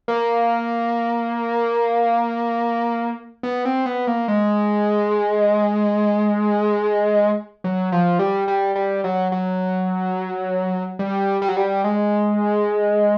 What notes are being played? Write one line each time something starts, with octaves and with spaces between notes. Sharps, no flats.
A#3
B3
C4
B3
A#3
G#3
F#3
F3
G3
G3
G3
F#3
F#3
G3
G3
F#3
G3
G#3